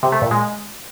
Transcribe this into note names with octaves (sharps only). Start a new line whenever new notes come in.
C3
A3
A#2
G#3